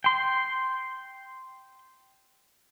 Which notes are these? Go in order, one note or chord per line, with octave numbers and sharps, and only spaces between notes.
G5 C6